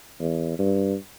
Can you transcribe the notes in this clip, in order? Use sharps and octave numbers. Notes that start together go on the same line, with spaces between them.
E2
G2